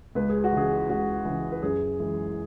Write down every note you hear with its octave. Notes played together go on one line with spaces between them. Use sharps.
C#2 B4
G#4
F#4
C#3 E3 G#4
C#2 F#4
C#3 E3
B4
F#2 G#4
E3 G#3